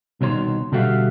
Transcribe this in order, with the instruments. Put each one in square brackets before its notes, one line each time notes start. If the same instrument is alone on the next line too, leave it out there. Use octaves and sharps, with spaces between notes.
[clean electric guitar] C2 B2 D#3 C#5 C6
B2 D3 G3 F#4 E5 F5